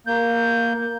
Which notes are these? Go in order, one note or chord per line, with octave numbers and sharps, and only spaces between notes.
A#3 G6